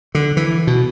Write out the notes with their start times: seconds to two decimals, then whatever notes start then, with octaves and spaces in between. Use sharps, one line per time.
0.15 D3
0.37 E3
0.67 B2